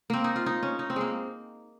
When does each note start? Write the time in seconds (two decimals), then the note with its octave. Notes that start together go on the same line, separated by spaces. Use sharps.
0.10 A#3 C4
0.24 D#4
0.36 F4
0.46 D#4
0.63 C#4
0.79 D#4
0.90 C4
0.96 G#3 A#3